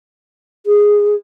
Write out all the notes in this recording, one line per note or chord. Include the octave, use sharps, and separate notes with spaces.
G#4